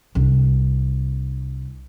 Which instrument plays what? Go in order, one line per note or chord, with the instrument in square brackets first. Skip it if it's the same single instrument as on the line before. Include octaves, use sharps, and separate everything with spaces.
[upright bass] C2 D4